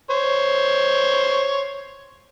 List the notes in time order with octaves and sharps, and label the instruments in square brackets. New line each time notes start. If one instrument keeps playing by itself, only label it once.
[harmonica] C5 C#5